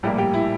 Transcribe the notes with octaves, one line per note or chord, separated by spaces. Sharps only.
A#1 A2 G3 A#3 G4
G3 G4
E4